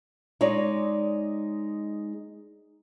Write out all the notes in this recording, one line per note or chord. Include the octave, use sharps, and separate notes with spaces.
G#3 D#4 C#5 D5